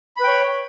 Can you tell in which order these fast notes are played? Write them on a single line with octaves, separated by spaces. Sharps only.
B5 B4 G5 C#5